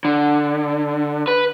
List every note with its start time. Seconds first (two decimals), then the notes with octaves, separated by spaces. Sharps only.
0.05 D3
1.28 B4